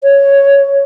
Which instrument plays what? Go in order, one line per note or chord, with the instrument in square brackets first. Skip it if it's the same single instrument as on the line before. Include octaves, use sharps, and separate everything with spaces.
[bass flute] C#5